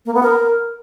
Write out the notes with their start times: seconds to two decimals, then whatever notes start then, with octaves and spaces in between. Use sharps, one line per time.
0.06 A#3
0.14 B3
0.23 A#4